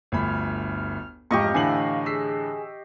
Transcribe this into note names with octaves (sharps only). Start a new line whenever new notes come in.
G1 D2 B5 F6
A1 F2 G#2 G4 D#5 F5 C#6
A2 D3 E3 G#5 C7 F#7
G#4 E6 B6 C7